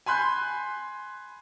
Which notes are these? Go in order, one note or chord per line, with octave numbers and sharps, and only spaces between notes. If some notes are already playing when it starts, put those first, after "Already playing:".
G#5 B5 C6 F#6 G6